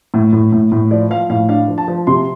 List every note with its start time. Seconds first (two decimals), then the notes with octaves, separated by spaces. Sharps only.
0.14 A2
0.33 A2
0.52 A2
0.72 A2
0.91 F3 D5
1.10 F3 F5
1.30 A2 F5
1.49 D4 F5
1.68 F3
1.78 A5
1.88 F3
2.07 C3 C6